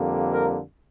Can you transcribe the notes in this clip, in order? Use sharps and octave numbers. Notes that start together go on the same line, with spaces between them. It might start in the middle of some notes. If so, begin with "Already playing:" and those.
Already playing: F2 D3 G3 A#3
A#4